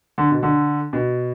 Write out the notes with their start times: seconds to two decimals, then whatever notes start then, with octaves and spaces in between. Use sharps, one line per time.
0.18 D3
0.31 B2
0.43 D3
0.93 B2